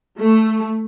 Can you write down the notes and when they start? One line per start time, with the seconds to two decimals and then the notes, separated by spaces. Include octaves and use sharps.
0.19 A3